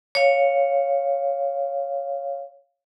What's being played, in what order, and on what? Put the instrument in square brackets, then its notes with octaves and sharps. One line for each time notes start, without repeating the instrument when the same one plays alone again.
[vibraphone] C#5 F5